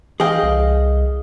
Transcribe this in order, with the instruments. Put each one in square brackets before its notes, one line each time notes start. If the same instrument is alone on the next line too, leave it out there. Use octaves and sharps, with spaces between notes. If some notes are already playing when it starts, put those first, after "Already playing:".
[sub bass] E3 [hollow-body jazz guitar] G#4 G5 [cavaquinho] D#5 F5
[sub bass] C2